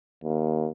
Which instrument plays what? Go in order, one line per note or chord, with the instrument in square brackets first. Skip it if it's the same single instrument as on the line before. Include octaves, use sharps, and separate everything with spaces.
[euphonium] D#2